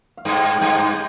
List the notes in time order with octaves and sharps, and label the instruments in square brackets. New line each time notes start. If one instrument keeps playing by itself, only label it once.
[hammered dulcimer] F5
[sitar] G2 [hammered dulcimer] G5
[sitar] G2 [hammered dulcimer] G5